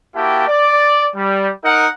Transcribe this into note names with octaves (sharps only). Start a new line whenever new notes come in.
A#3 E4 F#4 G4 G5 A5
D5
G3
D#4 A#4 F#5